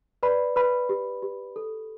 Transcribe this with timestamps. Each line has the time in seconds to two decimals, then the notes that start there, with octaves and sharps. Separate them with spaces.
0.23 B4 D5 B5
0.56 B4 B5
0.89 G4
1.23 G4
1.56 A4